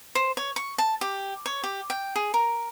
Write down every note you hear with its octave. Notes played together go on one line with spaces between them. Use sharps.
C5
C#5
C#6
A5
G4
C#5
G4
G5
G#4
A#4